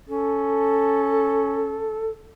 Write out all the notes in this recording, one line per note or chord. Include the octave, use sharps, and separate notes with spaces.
C#4 A4